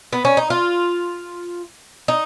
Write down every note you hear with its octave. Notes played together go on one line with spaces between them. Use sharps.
B3
C#4
D#4
F4
D#4